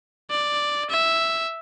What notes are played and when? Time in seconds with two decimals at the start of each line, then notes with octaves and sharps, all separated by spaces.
0.30 D5
0.90 E5